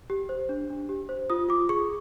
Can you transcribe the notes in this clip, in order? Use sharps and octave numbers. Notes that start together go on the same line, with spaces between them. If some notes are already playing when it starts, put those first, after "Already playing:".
G4
C5
D4
D4
G4
C5
F4 D#6
F4 D6
G#4 C#6